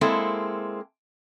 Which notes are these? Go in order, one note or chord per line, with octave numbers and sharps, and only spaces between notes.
G#3 A#3 C4 E4 A4